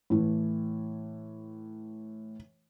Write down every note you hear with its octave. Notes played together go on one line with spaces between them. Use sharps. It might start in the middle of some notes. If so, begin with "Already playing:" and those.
A2 E3